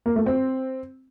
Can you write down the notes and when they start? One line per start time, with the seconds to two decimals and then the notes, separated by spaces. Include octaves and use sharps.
0.06 A#3
0.16 A3
0.26 C4